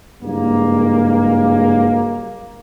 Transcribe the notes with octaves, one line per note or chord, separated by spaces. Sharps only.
F#1 G2 G#3 A#3